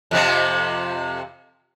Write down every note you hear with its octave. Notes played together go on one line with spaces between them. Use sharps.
F2 C3 F3